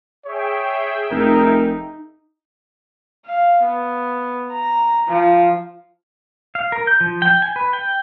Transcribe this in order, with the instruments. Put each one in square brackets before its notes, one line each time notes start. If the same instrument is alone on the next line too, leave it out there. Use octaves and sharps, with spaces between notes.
[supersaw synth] G#4 E5 G5 [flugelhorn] C#5
[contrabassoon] F1 [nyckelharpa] D#4 [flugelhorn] A#4
[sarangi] F5
B3
A#5
F3
[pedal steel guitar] F5
A#4
G6
F3
G5
G#5
B4
G5